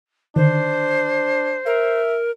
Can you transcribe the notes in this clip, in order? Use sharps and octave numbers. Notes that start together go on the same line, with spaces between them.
D3 D#3 D4 C5
A#4 E5